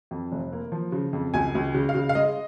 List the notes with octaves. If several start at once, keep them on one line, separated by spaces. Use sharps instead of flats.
F2
F1
A#3
F3
C#3
F2
C#2 G#5
C#2
C#3
F5
C#3
F5
G#3 D#5